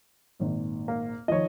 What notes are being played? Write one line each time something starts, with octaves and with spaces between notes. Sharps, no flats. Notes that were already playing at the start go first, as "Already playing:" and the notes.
G#1 A#2
A#3
D#3 F3 C#5 D#5